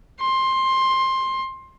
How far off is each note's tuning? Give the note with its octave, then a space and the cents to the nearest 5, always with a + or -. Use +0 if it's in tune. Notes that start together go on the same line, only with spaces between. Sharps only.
C6 +15